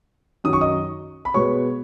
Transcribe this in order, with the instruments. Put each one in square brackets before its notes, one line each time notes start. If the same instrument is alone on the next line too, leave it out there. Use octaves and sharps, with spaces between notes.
[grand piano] F#2 D#3 F#3 D#6
C#6
D#5 D#6
B5
B2 G#3 B3 C#5 C#6